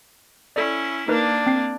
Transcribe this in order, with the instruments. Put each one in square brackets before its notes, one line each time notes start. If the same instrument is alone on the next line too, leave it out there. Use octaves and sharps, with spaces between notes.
[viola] C#4 E4 [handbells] A4 D5
[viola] A#3 D4 [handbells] D#4 A#4 B4
[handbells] C4 C7